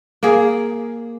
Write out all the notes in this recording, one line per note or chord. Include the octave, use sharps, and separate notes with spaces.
A#3 G#4